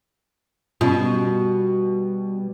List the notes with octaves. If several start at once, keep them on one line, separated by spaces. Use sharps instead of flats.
B2 G3 B3 C#4 F4